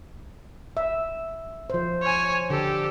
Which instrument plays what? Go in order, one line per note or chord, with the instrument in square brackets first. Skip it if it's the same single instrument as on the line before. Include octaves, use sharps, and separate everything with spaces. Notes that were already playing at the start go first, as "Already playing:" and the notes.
[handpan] E5
F3 C5
[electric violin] C#5 G#5
[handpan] D3 [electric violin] G4 A4